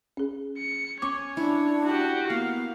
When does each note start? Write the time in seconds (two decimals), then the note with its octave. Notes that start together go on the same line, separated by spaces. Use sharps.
0.17 C#4 G#4
0.58 C#7
1.02 C#4 C#5 G#5 C#6 D6
1.37 D4 E4
1.85 F#4 G4
2.30 A#3 B3 F5